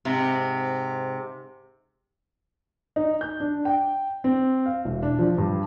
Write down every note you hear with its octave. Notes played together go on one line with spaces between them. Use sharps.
G#2 C3
D#4
G6
D4
G5
C4
F5
E1
D4
F3
G2